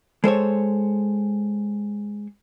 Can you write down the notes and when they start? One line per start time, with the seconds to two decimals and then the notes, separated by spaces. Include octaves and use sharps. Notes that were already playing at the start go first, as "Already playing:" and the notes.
0.24 G#3 A4 C5 C#5